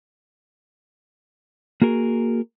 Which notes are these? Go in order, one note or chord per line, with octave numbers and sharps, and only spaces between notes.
A#3 F#4 G#4 A#4